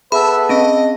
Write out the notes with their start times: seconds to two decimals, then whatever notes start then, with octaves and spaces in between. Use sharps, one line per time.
0.12 B3 G#4 A4 B4 E5 A5 B5
0.49 C4 C#4 D#5